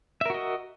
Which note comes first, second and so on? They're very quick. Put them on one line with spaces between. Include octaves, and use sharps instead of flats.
E5 A#4 F#4 D#5